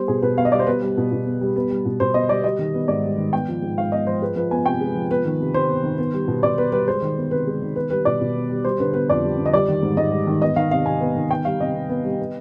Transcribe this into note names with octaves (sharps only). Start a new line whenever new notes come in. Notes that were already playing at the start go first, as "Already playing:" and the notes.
Already playing: G3 B3 C5
B2 G#4
B2 B4
B3 F5
D#5
G3 D5
C5
B3 B4
G3
B2
B2
B3
G3
B3
G3
B2
B2 C5
B3 D#5
G3 D5
G3 D#5
D#3
B3
G#2 D5
G3
D#3
B3 G5
F3
G#2
G#2 F5
B3 D#5
F3 C5
G#3 B4
F3 B4
B3 G#5
C3 G5
G#3
F3
B3 B4
D#3
C3
C3 C5
B3
D#3
B3
G3
B2
B2 D5
B3 B4
G3 B4
G#3 C5
D#3
B3
C3 B4
G#3
D#3
B3 B4
G3 B4
B2 D5
B2
B3
G3
G3 C5
D3 B4
B3 B4
F2 D5
G3
D3
D#5
G3 D5
D#3
G#2
G#2 D#5
G3
D#3
B3 D#5
D#3 F5
C3 F5
C3 G#5
B3
D#3
B3 G5
G3 F5
C3 D#5
C3
B3
G3
B3